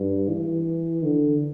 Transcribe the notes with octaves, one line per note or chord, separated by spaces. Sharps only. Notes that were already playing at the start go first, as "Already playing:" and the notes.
Already playing: G2
E3
D3